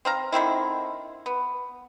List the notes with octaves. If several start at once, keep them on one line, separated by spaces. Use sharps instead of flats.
C4 F5 A#5
D3 D#3 C4 E4
B3